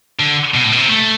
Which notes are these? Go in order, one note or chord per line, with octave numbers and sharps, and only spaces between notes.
D3
B2
A2
B2
C3
A3